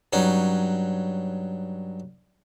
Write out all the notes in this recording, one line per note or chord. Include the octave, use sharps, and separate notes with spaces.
G2 F#3 C#4 D#4